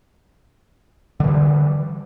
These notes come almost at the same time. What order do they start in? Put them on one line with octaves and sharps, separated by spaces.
D3 E3 G3